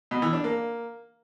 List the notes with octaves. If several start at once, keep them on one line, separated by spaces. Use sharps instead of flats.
B2
E3
D4
A#3